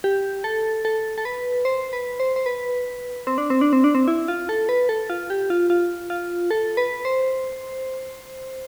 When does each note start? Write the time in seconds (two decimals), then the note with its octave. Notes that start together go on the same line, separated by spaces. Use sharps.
0.04 G4
0.44 A4
0.85 A4
1.18 A4
1.25 B4
1.65 C5
1.93 B4
2.20 C5
2.36 C5
2.46 B4
3.27 C4
3.38 D4
3.50 C4
3.61 D4
3.73 C4
3.84 D4
3.95 C4
4.08 E4
4.28 F4
4.49 A4
4.69 B4
4.89 A4
5.10 F4
5.30 G4
5.50 F4
5.70 F4
6.10 F4
6.51 A4
6.77 B4
7.05 C5